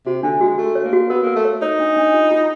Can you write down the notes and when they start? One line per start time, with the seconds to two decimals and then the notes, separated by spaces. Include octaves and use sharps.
0.06 C3 F#4
0.23 D3 D4
0.41 G#3 F#4
0.58 A3 F#4
0.75 C#5
0.84 A#3
0.93 F#4
1.10 B3 A#4
1.23 A#3 A#4
1.36 A3
1.45 C#5
1.62 D#4 C#5
1.79 D4
1.96 D4
2.14 F4
2.31 F4